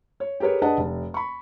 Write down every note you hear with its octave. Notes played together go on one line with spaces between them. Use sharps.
C#5
G4 G#4 A#4 B4 C#5
D4 G#4 B4 D#5 F#5 A5
F1
B5 C#6